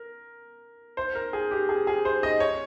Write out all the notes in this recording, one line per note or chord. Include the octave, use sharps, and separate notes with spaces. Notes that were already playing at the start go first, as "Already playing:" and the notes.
Already playing: A#4
C5
A#4
G#4
G4
G#4
G#4
C5
D#5
C#5